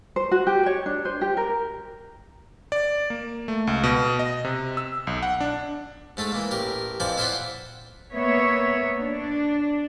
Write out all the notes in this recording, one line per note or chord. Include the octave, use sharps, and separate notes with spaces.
C5
F#4
G4
C#5
D4
C5
G4
A#4
D5
A#3
A3
C#2
B2
D#5
C3
E6
B1
F#5
D4
G#2 A3 A4
E3 A#3
A1 G4 A#4
F2 E3 F3 C4 D5 D6
E4 F4 C5 D5 E5 F#5
A#3 B3 C#5 E5
D4